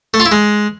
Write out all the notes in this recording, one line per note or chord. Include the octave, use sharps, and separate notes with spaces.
A3
F4
E4
G#3